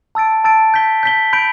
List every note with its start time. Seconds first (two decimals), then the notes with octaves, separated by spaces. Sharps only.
0.15 A5 E6 A6 D7
0.44 A5 E6 A6 D7
0.74 G6 B6 G7
1.03 G6 B6 G7
1.33 B5 G6 D7